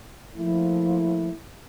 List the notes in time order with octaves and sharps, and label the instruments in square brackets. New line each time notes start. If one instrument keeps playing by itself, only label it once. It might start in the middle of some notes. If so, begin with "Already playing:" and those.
[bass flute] F3 [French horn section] A3 A#3 E4